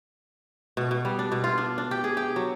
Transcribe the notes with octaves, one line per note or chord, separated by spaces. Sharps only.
B2
B2
G3
D4
B2
F4
D4
D4
G4
G#4
G4
F#3